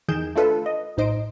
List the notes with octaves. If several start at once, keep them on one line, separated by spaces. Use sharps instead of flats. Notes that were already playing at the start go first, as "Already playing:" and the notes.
E2 D#3 G#4 G6 D7 E7
A3 D4 F4 A4 B4
D#5
A#1 A2 D#4 C5 D#5 D7